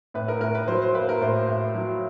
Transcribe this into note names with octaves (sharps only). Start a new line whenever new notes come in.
A2 B4
A#4
A2 A#4
B4
F#3 C5
C5
A#3 B4
A#4
A2 C5
A2
F#3